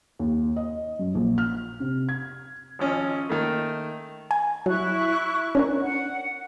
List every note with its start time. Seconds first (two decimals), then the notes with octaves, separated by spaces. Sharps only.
0.19 D#2
0.56 D#5
0.99 F#2
1.15 A#1
1.38 F6
1.80 C3
2.09 G#6
2.79 G#1 F3 C#4 D#5
3.29 D#3 A3 A#3
4.31 G#5
4.66 F#3 E4 C#6 F#6
5.55 C#4 D4 A#4
5.82 F#5